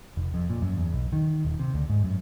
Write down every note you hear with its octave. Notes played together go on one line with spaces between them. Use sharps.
F1
F2
A#2
F#2
E2
B1
D#3
D#1
C3
D2
G#2
F#2